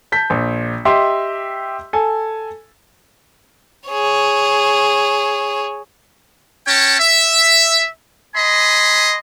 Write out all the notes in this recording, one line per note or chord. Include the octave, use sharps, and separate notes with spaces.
A5 G6 B6
A#1
G4 D#5 E5 C6
A4 G#5
G#4 C#5
C#4 C#5 G5 A5
E5
D#5 G#5 B5 C6